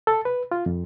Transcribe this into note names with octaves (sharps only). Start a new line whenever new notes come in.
A4
B4
F4
F2